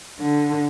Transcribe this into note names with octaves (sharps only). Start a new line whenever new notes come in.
D3